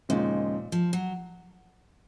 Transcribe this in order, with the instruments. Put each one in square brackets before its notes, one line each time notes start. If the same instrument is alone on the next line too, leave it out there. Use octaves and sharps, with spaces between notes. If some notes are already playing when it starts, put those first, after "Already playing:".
[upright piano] D#2 C#3 F3 G#3 D#4 [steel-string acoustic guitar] A#2
[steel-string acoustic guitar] F3
F#3